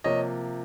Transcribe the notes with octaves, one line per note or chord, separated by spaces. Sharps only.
C3 F3 A#3 C#5 D#5